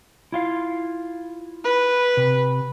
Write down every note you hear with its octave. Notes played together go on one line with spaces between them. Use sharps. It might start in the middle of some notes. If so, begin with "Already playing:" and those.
E4 F4 F5
B4
C3